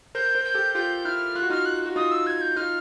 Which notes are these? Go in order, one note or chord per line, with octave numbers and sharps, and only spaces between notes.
A#4 C5 G6
A#4 C5
G6
G4 A4
F4 G4 G6
E4 F6
F4 F#6
F#4
D#4 F4 F6
F#6
F#4
D#4 F4 D#6
E6
G#6
G6
D#4 F4 F6